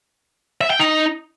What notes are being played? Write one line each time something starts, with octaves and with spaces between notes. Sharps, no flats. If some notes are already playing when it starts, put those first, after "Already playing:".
E5
G5
D#4